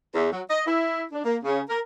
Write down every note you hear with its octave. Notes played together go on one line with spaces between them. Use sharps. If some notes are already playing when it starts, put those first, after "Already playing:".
E2
F#3
D#5
E4
D4
A#3
C#3
A#4